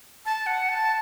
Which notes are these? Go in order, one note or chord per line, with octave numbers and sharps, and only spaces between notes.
A5
F#5
A5